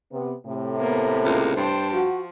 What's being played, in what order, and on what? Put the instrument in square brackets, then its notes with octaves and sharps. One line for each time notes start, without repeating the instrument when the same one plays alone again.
[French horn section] C3 B3
A2 C3
[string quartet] A#3 B3
[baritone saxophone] C#2 [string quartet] A#3
[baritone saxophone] G2 [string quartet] C5 G5 A5
[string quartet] F3 [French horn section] F#4